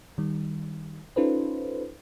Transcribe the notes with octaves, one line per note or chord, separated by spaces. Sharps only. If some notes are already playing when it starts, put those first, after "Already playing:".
D#3 G3
C#4 D#4 F4 A4 B4 C5